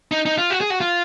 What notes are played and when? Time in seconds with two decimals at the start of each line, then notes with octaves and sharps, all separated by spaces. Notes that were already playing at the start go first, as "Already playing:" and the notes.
0.11 D#4
0.25 D#4
0.38 F4
0.50 F#4
0.61 G#4
0.70 F#4
0.81 F4